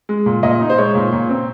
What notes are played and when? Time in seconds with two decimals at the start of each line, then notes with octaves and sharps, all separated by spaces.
0.09 G#3
0.26 A#2
0.43 A#2 D#5
0.61 D#4
0.70 C5
0.78 G#3 C#5
0.95 A#2
1.12 A#2
1.29 C4